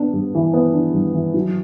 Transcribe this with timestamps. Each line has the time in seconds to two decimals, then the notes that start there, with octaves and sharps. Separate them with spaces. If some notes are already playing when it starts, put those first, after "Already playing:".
Already playing: B3 D4
0.13 G2
0.35 E3
0.54 B3
0.74 D4
0.94 G2
1.14 E3
1.34 F#3